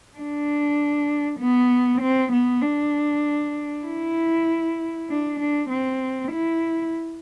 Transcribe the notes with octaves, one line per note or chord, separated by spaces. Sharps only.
D4
B3
C4
B3
D4
E4
D4
D4
C4
E4